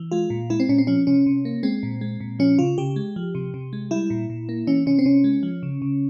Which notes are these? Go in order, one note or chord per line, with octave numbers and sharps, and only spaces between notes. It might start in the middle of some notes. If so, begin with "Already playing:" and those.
Already playing: E3
G#3 F4
A#2
G#3 E4
C4
A#2 C#4
C4
F3 C#4
C3 C#4
C3
A#3
G#3 C4
A#2
G#3
A#2
F3 C#4
C#3 F4
C#3 G4
G#3
F3
C3
C3
G#3
G3 E4
A#2
A#2
A#3
E3 C#4
C3 C#4
C4
C3 C#4
G#3
F3
C#3
C#3